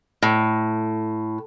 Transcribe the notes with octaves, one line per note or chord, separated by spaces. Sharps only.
A2